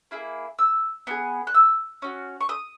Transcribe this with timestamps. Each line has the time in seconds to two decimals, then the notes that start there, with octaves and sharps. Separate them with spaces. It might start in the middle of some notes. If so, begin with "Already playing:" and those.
0.11 A#3 E4 G#4
0.59 E6
1.07 B3 D#4 G#4
1.47 F#6
1.54 E6
2.02 C#4 F#4
2.41 C#6
2.49 D#6